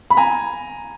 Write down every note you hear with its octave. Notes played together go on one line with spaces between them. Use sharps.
B5
G#5 A#5